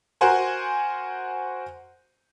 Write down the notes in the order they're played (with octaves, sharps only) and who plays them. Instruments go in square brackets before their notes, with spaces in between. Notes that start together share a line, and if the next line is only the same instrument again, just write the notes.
[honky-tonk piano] F#4 A#4 C5 F#5 G#5 C6